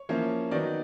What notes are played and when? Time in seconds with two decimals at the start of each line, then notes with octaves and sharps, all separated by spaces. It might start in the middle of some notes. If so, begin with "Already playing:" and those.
Already playing: C#5
0.09 F3 A#3 C#4 E4
0.51 D#3 F#3 B3 D#4 D5